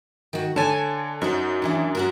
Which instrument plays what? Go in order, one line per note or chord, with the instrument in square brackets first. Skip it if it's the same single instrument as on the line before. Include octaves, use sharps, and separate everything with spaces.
[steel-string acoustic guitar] D#3 F#4
[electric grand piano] D3 C#5 A6 [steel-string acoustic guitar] G#5 A5
[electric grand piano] F#2 [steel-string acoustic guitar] D#4 F#4 C5
[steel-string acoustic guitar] D#2 E3 D4
C#4 F#4 A#4